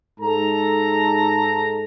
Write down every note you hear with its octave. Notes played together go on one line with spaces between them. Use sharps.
G#2 A4 A#5